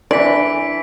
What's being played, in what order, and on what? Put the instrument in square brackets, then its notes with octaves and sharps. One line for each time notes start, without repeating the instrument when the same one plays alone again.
[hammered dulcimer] E3 [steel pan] D4 [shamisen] D5 [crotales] B6 D7